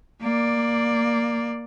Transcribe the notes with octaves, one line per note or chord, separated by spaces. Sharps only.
A#3 D5